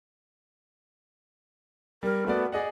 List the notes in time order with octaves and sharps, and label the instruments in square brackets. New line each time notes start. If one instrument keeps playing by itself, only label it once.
[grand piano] G3 [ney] A#4
[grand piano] A3 F#4 D5 [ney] B3
[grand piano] G#4 D#5 F#5 [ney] D5